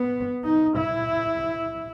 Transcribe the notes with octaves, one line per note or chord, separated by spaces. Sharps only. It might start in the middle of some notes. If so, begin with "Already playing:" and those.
Already playing: B3
D#4
E4